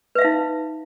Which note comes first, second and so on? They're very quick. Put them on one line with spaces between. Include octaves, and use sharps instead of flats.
B4 E5 F5 D#4